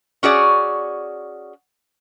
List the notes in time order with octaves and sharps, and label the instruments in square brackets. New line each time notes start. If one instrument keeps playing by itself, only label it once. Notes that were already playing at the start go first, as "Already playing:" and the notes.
[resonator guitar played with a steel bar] C#4 F#4 G#4 D5